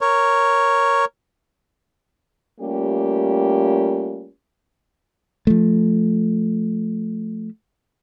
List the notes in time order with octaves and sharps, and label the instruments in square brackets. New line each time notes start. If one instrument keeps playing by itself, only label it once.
[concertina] A#4 C#5
[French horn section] G3 A3 A#3 C#4 F4 G4
[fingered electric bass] F3 A3